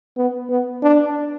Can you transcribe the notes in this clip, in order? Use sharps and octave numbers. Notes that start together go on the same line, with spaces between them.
B3
B3
D4